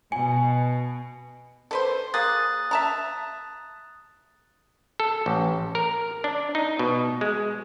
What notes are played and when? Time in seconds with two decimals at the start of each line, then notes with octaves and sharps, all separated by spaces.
0.12 B2 G#5
1.71 A4 B4 C5
2.14 A#3 G#4 D#6 F#6 A6
2.71 E5 A5 A#5
5.00 A4
5.26 A1
5.75 A#4
6.24 D4
6.55 D#4
6.79 B2
7.21 G#3